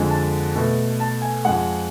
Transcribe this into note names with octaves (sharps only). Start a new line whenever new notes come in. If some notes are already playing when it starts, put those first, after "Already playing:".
Already playing: F2 D3 G#3
A5
B2 A3
A5
G#5
F2 F3 G#3 F#5